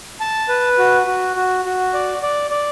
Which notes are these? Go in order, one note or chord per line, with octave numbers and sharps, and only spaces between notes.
A5
B4
F#4
F#4
F#4
F#4
D5
D5
D5